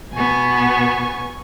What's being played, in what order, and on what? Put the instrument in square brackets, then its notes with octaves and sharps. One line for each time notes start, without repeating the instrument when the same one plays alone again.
[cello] B2 B3 [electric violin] G#5 C#6